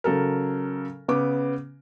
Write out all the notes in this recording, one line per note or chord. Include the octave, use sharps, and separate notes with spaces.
C#3 F#3 A4 A#4
C#3 B3 D6